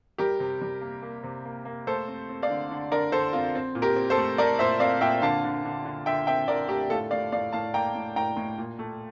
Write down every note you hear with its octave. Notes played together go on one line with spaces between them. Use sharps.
G3 G4 A#4
C3
G3
A#3
A#3
C3
A#3
A#3
A3 A4 C5
C4
C4
D5 F5
D3
D3
D3 A#4 D5
D3 A4 C5
C4 F4
C4
A#2
G4 A#4
C4
A4 C5
A3
A3 A#4 D5
A#2 C5 E5
C4 D5 F5
A#2 E5 G5
D3 F5 A5
D3
D3
D3
D3 E5 G5
C4 E5 G5
D3 A#4 D5
A3 G4 A#4
A2 F4 A4
A2 D5 F5
A2 D5 F5
A2 F5 A5
A#3 G5 A#5
A2
A2 G5 A#5
A2
A#2
A3